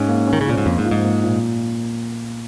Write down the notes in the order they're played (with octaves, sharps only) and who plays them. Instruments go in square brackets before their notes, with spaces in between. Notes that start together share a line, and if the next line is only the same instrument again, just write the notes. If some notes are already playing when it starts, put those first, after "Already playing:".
Already playing: [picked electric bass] G#2 [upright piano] C#4
[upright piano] A#3
C#4
[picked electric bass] D#3
C#3
[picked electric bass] A#2 [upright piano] F3
[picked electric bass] G#2
[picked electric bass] F2 [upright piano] A#3
[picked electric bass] G#2
[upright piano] F3
[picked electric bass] G#2
[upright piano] A#3
A#2